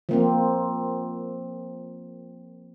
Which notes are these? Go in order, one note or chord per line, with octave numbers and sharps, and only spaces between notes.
F3 A#3 C4